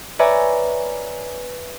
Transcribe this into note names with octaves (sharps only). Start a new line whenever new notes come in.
B4 C#5 D5 E5 G#5 A#5